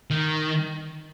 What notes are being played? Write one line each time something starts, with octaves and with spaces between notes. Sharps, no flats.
D#3